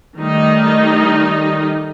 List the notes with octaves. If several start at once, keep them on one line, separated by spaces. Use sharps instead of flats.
D#3 G3 A3 D#4